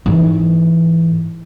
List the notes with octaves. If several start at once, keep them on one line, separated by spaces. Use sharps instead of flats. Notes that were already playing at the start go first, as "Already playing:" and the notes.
G#2 E3